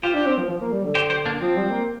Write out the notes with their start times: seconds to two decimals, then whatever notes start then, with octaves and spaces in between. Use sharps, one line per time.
0.03 F4 G4 C5
0.14 D4
0.26 C4
0.38 F3
0.49 F3
0.61 A#3
0.72 G3
0.84 D3
0.95 G4 C5
1.10 G4 C5
1.26 A#3 D4
1.41 F3 C4
1.57 G3
1.71 A#3